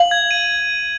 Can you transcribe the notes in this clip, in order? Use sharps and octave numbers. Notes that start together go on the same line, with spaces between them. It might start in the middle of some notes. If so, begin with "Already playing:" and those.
Already playing: F5 F#7
G#6
D#7